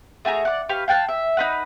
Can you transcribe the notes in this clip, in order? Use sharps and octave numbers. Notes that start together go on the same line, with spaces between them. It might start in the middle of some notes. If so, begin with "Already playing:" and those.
A3 F#4 G#4 A#5
D5 F#5
G4 B4 F5 C#6
F5 G5 A5 F#6
E5
D#4 B4 F#5